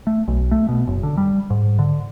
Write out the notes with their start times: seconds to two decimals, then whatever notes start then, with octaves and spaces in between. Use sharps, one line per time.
0.07 A3
0.28 B1
0.51 A3
0.69 B2
0.87 F#1
1.03 D3
1.17 G3
1.50 G#2
1.79 D3